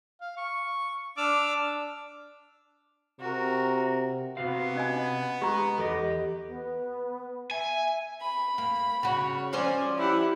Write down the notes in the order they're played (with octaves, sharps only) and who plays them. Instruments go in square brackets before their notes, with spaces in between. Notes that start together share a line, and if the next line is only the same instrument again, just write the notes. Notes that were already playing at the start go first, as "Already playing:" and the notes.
[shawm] F5
C#6
[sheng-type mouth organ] D4 E6 F6 [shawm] D6
[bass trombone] C3 [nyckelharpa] F#4 A#4
[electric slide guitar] C3 F#4 F5 [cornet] B3
[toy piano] C#4 D#5 G#5
[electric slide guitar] G#3 [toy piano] G4 A#5
[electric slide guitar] E2 G4 D#5 [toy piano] A4
[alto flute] B3
[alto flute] E5 [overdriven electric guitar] G#5
[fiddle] B5
[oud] A#3
[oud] C#3 F#4 [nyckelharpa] C#5
[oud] F3 C#4 C5 [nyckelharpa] D5 [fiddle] G#5
[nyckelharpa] E4 F#5 [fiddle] G4